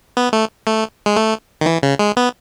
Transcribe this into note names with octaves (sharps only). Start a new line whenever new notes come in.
B3
A3
A3
G#3
A3
D#3
E3
C#3
G#3
B3